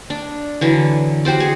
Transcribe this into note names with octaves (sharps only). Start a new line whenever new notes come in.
D4
D3 E3 F#3
F#4 G4 C5 D5
G#4